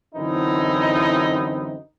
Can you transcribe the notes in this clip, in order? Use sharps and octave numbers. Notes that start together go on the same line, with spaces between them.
F#2 D3 E3 C4 D#4 E4